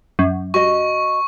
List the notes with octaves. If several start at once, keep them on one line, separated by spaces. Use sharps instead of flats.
F#2
F#4 D#5 C#6